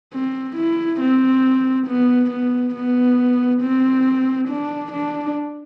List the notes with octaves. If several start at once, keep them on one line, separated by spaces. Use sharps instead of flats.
C4
E4
C4
B3
B3
B3
C4
D4
D4